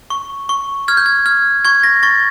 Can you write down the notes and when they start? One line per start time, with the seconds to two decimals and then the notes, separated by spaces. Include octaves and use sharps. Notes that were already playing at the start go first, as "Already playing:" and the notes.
0.10 C#6
0.49 C#6
0.88 F6 G#6
0.97 G6
1.06 G#6
1.26 F6 G#6
1.65 C#6 G#6
1.83 A#6
2.03 C#6 A6